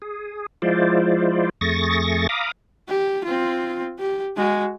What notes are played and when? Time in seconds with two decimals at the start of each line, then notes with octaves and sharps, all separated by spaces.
0.02 G#4
0.62 F3 G#3 E4 F4 C5 D5
1.61 F2 A3 G#4 C#6 A6 A#6
2.29 F5 A#5 B5 D6 D#6
2.89 G4
3.24 C4 F4
3.99 G4
4.37 G#3 F#4